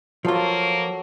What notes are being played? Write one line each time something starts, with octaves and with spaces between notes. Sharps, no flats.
F3 F#3 A#3 F4 A4 C#6